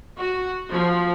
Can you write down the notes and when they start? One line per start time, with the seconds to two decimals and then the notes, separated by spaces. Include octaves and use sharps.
0.17 F#4
0.72 F3